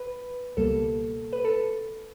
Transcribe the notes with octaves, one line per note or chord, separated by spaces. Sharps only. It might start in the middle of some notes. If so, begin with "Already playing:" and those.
Already playing: B4
C#2 B2 G3 A#3 A4
B4
A4